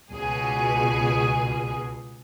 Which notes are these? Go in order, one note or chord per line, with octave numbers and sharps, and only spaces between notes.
C#2 B2 G#4